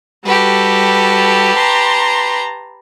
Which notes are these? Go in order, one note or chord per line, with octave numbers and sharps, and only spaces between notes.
G3 F#4 G4 A4 B4
A5 A#5 C6